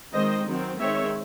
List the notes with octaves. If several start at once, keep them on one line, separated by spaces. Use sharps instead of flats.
D#3 G#3 C4 C5 D#5
D#3 F#3 C4
D#3 G#3 C4 C#5 E5